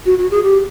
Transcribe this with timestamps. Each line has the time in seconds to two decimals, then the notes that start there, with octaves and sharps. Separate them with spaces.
0.06 F#4
0.18 F#4
0.31 G#4
0.44 G4